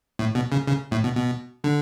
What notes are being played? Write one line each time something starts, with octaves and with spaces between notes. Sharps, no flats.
A2
B2
C#3
C#3
A2
B2
B2
D3